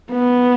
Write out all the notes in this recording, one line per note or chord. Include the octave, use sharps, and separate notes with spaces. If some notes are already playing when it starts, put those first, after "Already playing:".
B3